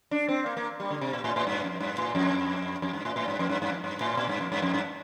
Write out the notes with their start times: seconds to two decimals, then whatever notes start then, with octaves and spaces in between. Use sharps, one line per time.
0.11 D4
0.28 C4
0.46 A#3
0.57 A#3
0.80 G3
0.90 D3
1.01 C3
1.13 A#2
1.24 A2
1.36 A2
1.47 G2
1.64 F2
1.80 G2
1.98 A2
2.15 F2
2.82 F2
2.93 G2
3.05 A2
3.16 A2
3.28 G2
3.39 F2
3.49 G2
3.62 G2
3.72 F2
3.84 G2
4.01 A2
4.17 A#2
4.29 G2
4.41 F2
4.52 G2
4.62 F2
4.74 G2